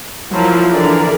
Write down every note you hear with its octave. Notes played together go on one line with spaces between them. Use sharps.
F3 F#3 E4 A#4
D3 E3 G#4 A#4 D5